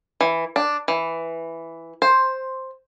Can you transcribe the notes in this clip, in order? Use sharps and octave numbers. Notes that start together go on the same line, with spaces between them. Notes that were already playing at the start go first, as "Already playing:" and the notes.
E3
D4
E3
C5